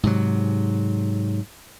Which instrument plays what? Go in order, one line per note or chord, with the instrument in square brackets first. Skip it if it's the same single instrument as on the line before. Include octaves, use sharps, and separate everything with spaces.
[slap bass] G#2 C3 F#3